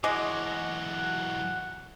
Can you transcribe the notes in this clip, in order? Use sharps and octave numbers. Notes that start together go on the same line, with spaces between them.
E3 F#3 G#3 D#5 F#5 D6